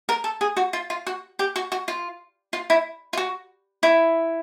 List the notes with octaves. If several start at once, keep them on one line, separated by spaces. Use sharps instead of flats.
A#4
A4
G#4
F#4
F4
F4
F#4
G4
F#4
F#4
F4
F4
E4
F4
F#4
E4